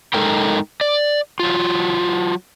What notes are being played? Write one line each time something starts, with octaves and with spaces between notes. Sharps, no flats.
G#3 D#4 A4 A#4 G5
D5
F#3 F4